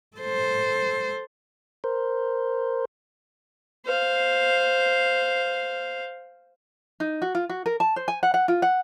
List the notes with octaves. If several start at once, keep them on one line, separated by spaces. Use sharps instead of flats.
A4 C5
A#4 C5
C5 F5
D#4
F#4
F4
F#4
A#4
A5
C5
G#5
F#5
F#5
F4
F#5